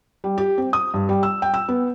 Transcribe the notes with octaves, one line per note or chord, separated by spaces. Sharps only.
G3
G4
C4
D#6
G2
G3
E6
G5
E6
B3